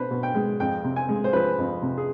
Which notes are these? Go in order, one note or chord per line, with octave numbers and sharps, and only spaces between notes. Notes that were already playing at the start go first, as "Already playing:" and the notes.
Already playing: B2 D4 B4 C5
B2
G5
G#3
F2 G5
C3
G#5
G#3
C5
F3 B4
F2
C3
G#4